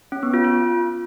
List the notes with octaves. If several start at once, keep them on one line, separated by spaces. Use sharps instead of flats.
C#4
B3
F4
F4